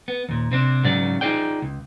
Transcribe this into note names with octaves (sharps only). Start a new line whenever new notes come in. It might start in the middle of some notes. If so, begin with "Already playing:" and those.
B3
D#2 A#2
C3 C4 D4
G#2 C#3 F#3 D5
D#4 F4 G#4 D5 G5
C#2